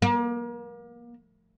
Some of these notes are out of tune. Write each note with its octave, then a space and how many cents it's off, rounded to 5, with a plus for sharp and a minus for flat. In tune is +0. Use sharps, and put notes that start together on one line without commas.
A#3 +35